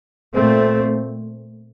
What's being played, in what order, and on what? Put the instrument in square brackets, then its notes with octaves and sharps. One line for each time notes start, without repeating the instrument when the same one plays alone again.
[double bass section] A#2 A3 C4